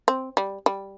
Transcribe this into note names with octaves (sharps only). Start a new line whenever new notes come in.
C4
G3
G3